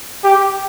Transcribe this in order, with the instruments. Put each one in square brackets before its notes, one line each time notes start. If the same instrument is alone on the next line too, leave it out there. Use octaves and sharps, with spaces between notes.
[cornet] G4